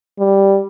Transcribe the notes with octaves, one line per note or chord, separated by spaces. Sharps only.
G3